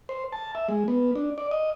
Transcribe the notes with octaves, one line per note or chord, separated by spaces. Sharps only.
C5
A5
E5
G#3
B3
D4
D5
D#5